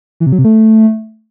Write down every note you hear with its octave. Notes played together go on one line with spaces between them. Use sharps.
E3
C3
F#3
C3
A3